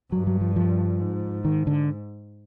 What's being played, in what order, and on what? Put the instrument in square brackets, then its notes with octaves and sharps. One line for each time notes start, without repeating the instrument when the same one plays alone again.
[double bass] G2 [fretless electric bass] F#3
[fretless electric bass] F#3
F3
F3
[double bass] G#2
[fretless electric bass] D#3
D3